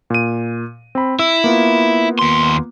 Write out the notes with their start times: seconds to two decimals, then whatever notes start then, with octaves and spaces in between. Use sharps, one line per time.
0.10 A#2 D#7
0.95 C4 B5
1.19 E4 E6
1.44 A#3 B3 F4
2.19 D#2 C6